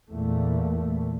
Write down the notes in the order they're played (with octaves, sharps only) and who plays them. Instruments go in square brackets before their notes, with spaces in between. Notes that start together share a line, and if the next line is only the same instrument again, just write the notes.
[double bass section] E2 A#2 A3